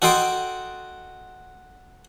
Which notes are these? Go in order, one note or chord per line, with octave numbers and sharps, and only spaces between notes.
F#4 A4 D#5 G5 C6 D6